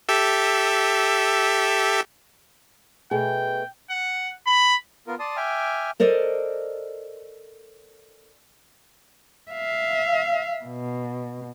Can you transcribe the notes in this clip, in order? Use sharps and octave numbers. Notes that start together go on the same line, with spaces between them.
G4 A4 E5
B2 A3 G#4 G5
F#5
B5
B3 F4 A#4
D5 A5 C6 D#6
E5 G5 G#5 D6 F6
A4 A#4 C5 D5 D#5
E5 F5
B2